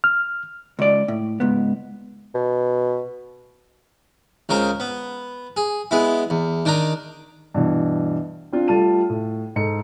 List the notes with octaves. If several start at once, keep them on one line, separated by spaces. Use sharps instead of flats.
F6
C#2 D5
A2
C#2 G#2 B3
B2
C#2 C#3 A#4 C5
B3
G#4
G#3 B3 E4
E2
D#3 D4 D#4 A#5
G2 B2 E3
C4 D4 F4
G3 A3 F4 A5 D#7
A2
G#2 A4 C#7